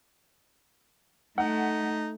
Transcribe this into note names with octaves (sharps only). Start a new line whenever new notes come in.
A3 D#4 F#5